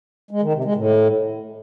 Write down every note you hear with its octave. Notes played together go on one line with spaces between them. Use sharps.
G#3
D#3
C3
G#3
A2